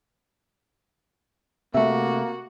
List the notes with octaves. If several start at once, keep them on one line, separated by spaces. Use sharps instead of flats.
C3 A3 A#3 F#4 E5